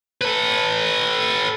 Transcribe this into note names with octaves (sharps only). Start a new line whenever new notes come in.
A4 B4